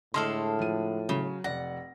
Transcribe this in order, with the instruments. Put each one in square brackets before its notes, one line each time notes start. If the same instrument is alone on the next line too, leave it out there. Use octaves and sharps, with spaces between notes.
[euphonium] A2 [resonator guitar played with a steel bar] D3 G#3 A4 [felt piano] C6 F6
[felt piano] F3 D#7
[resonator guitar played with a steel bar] C#3 [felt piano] F#3
[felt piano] F1 D5 A#6 [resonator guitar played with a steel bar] F#5